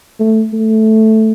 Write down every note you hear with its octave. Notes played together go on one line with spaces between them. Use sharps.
A3
A3